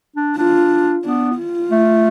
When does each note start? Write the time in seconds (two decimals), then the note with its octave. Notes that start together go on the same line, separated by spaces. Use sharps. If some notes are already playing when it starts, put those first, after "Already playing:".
0.16 D4
0.37 D4 F4
1.05 B3 D4
1.38 F4
1.71 A3